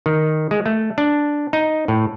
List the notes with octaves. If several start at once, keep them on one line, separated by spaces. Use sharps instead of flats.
D#3
G#3
A3
D4
D#4
A2